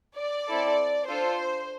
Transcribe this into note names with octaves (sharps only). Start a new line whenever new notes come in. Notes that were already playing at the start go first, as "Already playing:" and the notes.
D5
C4 E4 A4
D4 F4 A4 C5